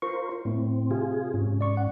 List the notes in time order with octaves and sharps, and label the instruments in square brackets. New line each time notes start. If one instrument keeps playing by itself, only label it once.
[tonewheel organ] F4 A#4 C5 [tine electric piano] C#6
[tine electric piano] A2 [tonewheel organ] C4
[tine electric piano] C3 [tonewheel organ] F4 G#4
[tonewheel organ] G#2 C#4
[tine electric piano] D5 C#6
F#5